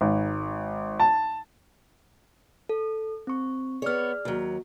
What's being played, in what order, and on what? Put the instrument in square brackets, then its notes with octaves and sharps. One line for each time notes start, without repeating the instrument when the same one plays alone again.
[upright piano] G#1
A5
[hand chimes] A4
C4 C#6
[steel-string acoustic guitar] B3 C#5 [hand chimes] G#4 D5 F6
[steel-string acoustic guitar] D#2 F#3